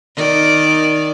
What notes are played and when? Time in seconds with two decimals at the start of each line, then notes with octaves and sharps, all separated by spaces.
0.16 D#3 D5